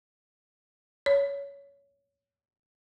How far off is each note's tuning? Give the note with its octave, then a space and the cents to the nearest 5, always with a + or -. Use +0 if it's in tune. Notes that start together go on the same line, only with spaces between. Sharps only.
C#5 +20